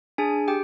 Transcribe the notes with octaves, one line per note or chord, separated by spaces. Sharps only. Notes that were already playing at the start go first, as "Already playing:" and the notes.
D4 G#4 G#5
G4 G5